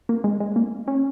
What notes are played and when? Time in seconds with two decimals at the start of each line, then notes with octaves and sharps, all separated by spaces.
0.09 A#3
0.24 G#3
0.40 G#3
0.56 A#3
0.88 C#4